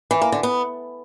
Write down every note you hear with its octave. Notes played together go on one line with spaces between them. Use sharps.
E3
A#3
D3
B3